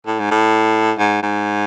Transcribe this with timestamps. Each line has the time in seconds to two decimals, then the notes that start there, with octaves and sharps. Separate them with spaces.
0.07 A2
0.20 G#2
0.31 A2
0.99 G#2
1.22 G#2